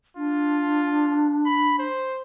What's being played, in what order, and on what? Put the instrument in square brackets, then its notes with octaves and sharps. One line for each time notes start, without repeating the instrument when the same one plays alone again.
[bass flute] D4 [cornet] F4
[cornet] B5
C5